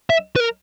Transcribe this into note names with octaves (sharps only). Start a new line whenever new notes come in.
E5
B4
A#4